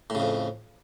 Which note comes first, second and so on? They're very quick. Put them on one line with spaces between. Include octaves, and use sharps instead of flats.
A2 C#3 F2